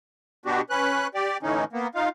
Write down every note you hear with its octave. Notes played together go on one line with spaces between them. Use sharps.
B2 B3 D4 F#4 G4
C#4 B4 F#6
G4 D5
A2 D3 E3 C#4 D#4
A#3 B3
D#4 F4 F5